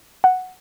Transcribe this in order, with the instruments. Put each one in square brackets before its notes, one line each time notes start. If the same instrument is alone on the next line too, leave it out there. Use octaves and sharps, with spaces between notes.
[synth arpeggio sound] F#5